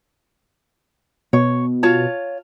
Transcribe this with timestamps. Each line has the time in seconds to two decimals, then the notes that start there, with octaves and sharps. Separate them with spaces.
1.33 B2 C#5
1.83 F4 C#5 A5